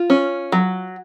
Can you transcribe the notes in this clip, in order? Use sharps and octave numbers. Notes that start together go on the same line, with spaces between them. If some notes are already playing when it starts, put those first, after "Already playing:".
Already playing: F4
C#4
F#3